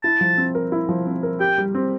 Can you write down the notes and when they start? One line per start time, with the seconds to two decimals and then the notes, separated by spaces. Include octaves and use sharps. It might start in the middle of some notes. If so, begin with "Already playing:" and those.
0.04 E4 A5
0.21 F3
0.38 C4
0.55 A#4
0.72 E4
0.89 F3
1.07 C4
1.23 A#4
1.40 G4 G5
1.58 G3
1.75 C4